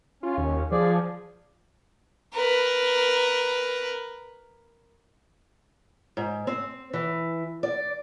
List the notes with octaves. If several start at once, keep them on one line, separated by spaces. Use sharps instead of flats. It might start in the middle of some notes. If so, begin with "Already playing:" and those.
C#4 F4
D#2
F3 G#4 D5
A#4 B4
G#2
C4
E3
D5